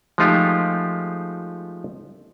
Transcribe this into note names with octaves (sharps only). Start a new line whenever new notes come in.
F3 G#3 A3 D#4 F4 G4